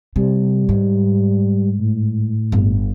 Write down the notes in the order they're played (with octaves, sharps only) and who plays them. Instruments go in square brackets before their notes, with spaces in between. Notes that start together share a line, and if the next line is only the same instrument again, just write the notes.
[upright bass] C3 [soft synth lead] G3
[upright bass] G#2
[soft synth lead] A2
[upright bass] G1